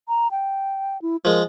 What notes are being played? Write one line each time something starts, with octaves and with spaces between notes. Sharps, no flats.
A#5
G5
E4
F3 G#3 A#4